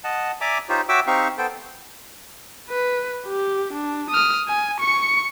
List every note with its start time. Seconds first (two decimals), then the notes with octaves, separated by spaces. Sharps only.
0.04 D#5 F#5 A5
0.41 D5 E5 G#5 A#5 D6
0.69 D#4 F4 G4 C5 C#5
0.89 F#4 C#5 E5 G5 D6 E6
1.07 C4 D#4 G4 F5 C#6
1.38 B3 A4 C5 G5
2.69 B4
3.28 G4
3.73 D4
4.10 D#6 F6
4.48 G#5
4.80 C#6 C#7